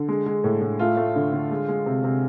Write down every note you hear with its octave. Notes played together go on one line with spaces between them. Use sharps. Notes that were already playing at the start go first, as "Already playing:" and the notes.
Already playing: D3
G#3
G#3
A2
A2
A3 F4
A3
D3
D3
G#3
G#3
C3
C3